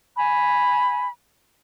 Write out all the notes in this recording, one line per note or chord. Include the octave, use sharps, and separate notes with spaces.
G#5 B5